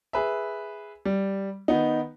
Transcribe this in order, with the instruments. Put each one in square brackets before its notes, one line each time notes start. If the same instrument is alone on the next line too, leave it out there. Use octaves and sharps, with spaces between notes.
[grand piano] G#4 B4 E5
G3
D#3 B3 D#4